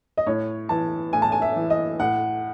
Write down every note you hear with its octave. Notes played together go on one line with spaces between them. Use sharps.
D#5
A2 C#5
E3 A5
A2 G#5
A5
G#5
E5
E3
D#5
A2 F#5